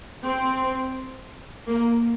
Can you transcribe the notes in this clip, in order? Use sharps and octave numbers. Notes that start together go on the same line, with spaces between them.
C4
A#3